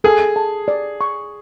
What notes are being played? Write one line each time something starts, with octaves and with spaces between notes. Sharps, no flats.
G#4 A4
A5
D5
C#6